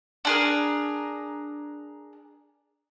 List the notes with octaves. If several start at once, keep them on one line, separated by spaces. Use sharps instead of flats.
D4 G#4 A#4